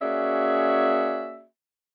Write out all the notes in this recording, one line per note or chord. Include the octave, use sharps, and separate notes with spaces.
A#3 C#4 F#4 G#4 D5 E5